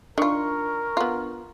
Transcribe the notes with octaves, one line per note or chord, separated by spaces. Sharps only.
D#3 D4 F4 A#4 C#6
B3 F4